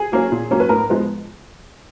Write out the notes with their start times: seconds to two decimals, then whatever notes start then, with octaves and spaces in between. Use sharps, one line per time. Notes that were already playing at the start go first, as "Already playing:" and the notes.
Already playing: G#4
0.12 F#3 A#3 C#4
0.32 A#2
0.51 F#3 A#3 C#4
0.60 B4
0.69 A2 A#4
0.89 F3 G#3 B3